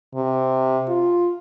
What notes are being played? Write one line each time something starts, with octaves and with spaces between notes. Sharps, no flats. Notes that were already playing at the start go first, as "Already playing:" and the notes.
C3
F4